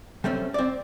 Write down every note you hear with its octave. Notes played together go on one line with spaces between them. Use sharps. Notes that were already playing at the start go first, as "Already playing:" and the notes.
G3 A3 C4 C#4
C4 D5